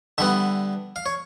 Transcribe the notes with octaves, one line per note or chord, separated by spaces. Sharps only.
D3 G3 B3 E5
F5
C#5